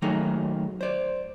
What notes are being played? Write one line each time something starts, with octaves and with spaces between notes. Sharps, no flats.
D#3 F#3 A3 A#3 D#4 G#4
C5 D5